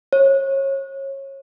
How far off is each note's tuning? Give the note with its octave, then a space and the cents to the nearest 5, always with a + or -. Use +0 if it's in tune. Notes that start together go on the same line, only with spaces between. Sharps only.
C#5 -30